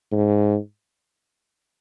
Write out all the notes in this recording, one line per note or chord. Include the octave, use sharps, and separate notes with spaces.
G#2